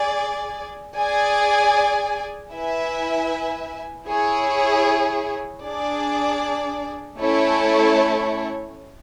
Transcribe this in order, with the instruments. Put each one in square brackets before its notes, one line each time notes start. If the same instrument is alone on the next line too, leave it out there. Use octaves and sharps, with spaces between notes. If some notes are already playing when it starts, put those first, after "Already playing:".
Already playing: [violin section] G#4 D5 G#5
G#4 D5 G#5
E4 B4 E5 G#5
E4 G#4 C#5
D4 G#4 D5
A3 C#4 E4 A4 C#5